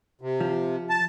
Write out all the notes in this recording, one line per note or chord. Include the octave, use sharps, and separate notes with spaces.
C3
F3
A5